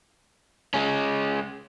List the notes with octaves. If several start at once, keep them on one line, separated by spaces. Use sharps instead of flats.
G#3 C#4